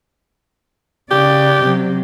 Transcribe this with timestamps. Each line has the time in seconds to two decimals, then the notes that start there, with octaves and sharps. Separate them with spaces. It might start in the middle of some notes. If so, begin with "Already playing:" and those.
1.11 C#3 G4 D5
1.63 C3 F#3